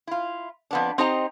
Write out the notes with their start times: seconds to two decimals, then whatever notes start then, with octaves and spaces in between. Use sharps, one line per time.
0.07 E4 F4
0.71 F2 B3 D4
0.98 C4 D#4 G4 C5 D#5 A#5